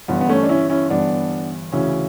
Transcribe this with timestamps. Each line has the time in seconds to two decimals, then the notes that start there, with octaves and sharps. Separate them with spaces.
0.08 G1 G2 E3 B3
0.21 B3
0.29 A3 C#4
0.43 D4
0.49 C#4 E4
0.70 C#4 E4
0.90 G1 G2 E3 B3 D4
1.72 D2 C#3 E3 C#4 E4